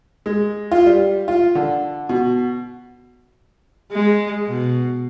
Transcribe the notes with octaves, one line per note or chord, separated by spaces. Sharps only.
G#3
F4
G3
F4
D3
B2
G#3
B2